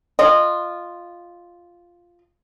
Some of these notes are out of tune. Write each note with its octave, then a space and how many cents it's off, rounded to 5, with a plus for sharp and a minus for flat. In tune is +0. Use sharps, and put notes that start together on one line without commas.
F4 +0 D#5 -20